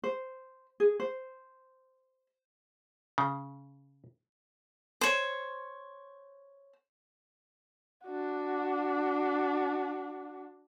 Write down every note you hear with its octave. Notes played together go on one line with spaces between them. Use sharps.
C5
G#4
C5
C#3
C5 C#5
D4 F#4